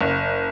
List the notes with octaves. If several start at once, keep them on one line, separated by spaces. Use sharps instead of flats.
F#1